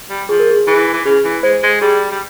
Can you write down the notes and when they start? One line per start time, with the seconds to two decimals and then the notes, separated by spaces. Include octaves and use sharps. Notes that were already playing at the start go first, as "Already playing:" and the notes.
0.10 G3
0.29 F3 G#4
0.39 A#4
0.50 G#4
0.67 E3 G#4
0.93 E3
1.05 C#3 G#4
1.24 E3
1.43 G#3 C5
1.63 G#3
1.81 G3 G#4
2.11 G3